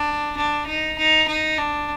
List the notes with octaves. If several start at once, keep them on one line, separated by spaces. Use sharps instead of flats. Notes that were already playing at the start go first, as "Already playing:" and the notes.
Already playing: D4
D4
D#4
D#4
D#4
D4